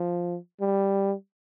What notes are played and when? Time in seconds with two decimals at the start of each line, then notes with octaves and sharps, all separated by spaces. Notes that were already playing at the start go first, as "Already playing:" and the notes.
Already playing: F3
0.61 G3